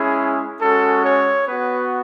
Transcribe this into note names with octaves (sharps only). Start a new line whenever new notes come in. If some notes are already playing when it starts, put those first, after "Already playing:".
Already playing: G#3 C#4 E4 G#4
G#3 C#4 F#4 A4
C#5
B3 F#4 B4